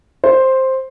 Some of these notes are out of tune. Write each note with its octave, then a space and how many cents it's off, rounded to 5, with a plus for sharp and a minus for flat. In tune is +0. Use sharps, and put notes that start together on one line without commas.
C5 +5